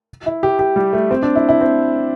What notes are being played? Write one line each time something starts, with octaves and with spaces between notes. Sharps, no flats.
E4
G4
G4
G3
A3
C4
D4
E4
E4
C4